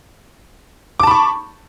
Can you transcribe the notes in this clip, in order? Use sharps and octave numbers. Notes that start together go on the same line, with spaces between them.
A5 B5 C#6 D6